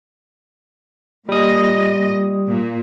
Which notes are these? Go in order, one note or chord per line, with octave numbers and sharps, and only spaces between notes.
A#2 G3 D#5 D#6
A#2